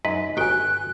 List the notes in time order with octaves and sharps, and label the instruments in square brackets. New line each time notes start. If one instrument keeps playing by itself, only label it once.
[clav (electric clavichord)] F#2 F#3 B4 [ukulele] D#4 D#5
[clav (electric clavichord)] G1 D#3 G5 [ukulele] F#4 G#5 [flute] F#6